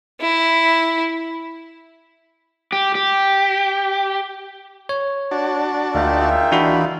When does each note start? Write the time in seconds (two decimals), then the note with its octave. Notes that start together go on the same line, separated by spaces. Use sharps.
0.21 E4
2.72 G4
2.95 G4
4.89 C#5
5.31 D4 F#4 A5
5.95 D2 A#3 D#4 F4 G#4 E5 G5
6.52 E3 D4 F#4 B5